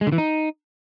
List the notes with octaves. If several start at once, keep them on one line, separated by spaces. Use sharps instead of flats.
G#3
D3
E3
D#4